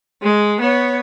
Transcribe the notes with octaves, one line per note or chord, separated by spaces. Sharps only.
G#3
B3 C#5